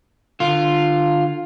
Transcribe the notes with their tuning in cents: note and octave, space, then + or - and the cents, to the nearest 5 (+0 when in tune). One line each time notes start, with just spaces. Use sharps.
D3 +30 F4 +0